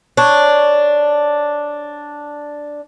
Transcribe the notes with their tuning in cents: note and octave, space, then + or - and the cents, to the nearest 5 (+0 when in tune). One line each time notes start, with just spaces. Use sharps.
D4 +0 C#5 +0